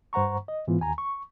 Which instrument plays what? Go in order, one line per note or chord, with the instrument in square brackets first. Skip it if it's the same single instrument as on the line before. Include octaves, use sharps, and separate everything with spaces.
[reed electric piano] G2 C5 F#5 A#5 C#6
D#5
G#2 E3 B3 F4
D#2 G#5 A#5
C#6